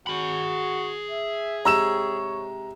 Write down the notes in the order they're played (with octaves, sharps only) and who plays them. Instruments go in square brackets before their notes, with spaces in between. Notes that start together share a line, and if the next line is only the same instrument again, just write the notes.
[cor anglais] F#4 [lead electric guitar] G#4 B5
[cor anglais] E5
[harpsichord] G#2 C3 G5 [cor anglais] C#5 [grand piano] A#5 E6 E7